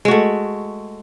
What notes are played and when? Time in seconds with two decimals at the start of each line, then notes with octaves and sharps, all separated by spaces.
0.05 G#3
0.08 F#4
0.11 A3